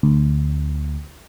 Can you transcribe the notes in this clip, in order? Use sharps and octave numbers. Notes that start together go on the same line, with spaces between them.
D2